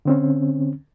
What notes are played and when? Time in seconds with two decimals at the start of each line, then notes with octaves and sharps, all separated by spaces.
0.05 D3 C4 C#4